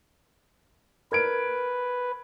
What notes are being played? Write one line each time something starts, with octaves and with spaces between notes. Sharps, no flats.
A#4 B4 G#6 D7